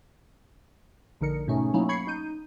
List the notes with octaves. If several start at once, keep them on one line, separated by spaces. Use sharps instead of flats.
A#1 D3 D#4 A#4 C#7
G#2 B2 A3 C#4 D#4
F#3 A3 A#3 C#4 D#4 E4
B5 C#6 G#6 C7 C#7
D#4 G6 D#7